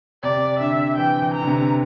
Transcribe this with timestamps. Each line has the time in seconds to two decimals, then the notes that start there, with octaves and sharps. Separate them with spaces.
0.23 C3 D5
0.60 D3 E5
0.97 E3 G5
1.22 E3
1.34 A#5
1.42 D3
1.47 C3